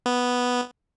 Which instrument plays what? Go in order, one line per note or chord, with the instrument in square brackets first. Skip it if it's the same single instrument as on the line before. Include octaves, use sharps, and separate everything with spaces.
[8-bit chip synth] B3